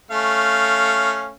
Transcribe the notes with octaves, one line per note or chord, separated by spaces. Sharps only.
A3 C#4 F5